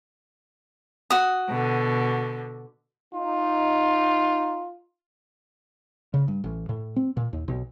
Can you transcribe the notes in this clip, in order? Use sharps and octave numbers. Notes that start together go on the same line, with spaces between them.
F#4 D#6
B2 D3
D#4 F4
C#3
G2
A1
A2
C4
A#2
D#2
B1